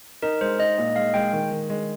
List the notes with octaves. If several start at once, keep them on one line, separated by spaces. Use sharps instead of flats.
D#4 A#4
G#3 C5
D#4 D#5
A#2 D#5
G#3 F5
G#3 G5
D#3
D#3
G#3